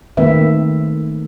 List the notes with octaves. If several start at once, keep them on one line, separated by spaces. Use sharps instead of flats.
D#3 A3 A#3 C4 B4 E5